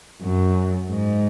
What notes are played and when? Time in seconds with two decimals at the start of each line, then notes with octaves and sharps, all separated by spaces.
0.22 F#2
0.90 G#2